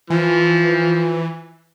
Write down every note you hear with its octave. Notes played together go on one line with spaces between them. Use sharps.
E3 F3